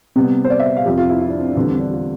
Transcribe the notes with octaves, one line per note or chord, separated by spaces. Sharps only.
C3 G3 B3
C5
D5
E5
D5
F5
F2 C3 F3 G4
F4
E4
E4
D4
C4
D4
E2 D3 G3 C4
C4
D4
F4